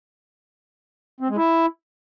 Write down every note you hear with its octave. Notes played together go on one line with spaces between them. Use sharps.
C4
G#3
E4